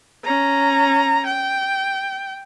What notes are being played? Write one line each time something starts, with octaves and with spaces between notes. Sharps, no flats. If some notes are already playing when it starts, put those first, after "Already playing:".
C#4 A#5
G5